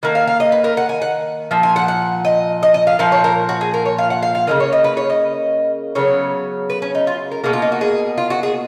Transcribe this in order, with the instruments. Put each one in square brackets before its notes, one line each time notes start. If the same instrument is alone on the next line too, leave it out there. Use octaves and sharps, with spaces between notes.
[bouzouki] D#3 A#3 F#5
F5
F5
D#5
B4
A#4
F#5
G#5
F#5
A#2 F3
G#5
F#5
F#5
D#5
D#5
D#5
F5
A#2 F3 F5
C#5
A#4
F#4
G#4
A#4
C#5
F5
F#5
F5
F5
C#3 F3 A#3 D#5
C#5
D#5
B4
C#5
D#5
C#3 F#3 B3 C#5
B4
C#4
D#4
F4
A#4
B2 A#3 G#4
F4
D#4
F#4
G#4
F4
F#4
G#4